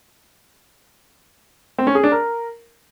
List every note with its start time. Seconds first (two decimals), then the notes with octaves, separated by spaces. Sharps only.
1.78 C4
1.87 C#4
1.95 G#4
2.04 D4
2.12 A#4